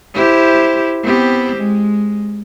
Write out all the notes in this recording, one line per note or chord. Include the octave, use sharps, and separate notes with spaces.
E4 G4 C5
B3 C4 G4
G#3